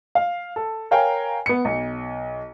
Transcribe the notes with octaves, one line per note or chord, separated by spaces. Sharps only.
F5
A4
A#4 C#5 F5 G5 G#5 A#5
B3 C#7
B1